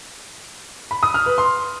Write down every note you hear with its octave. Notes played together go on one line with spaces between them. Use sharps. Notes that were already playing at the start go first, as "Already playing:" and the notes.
B5
D#6
F6
B4
C6